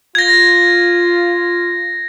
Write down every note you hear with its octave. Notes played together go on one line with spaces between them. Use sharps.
F4 G#6 A#6